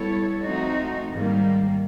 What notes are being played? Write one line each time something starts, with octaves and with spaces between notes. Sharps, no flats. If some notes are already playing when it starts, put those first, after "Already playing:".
Already playing: G3 B3 E4 A4 C#5
F3 A3 C4 D#4 F#4
G#2 D#3 G3 A#3